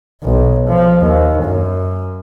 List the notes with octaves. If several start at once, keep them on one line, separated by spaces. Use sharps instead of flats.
B1
F3
D#2
F#2